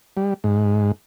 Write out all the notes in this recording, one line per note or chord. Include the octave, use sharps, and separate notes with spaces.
G3
G#2